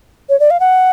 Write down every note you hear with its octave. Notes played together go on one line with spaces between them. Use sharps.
C#5
D5
F5
F#5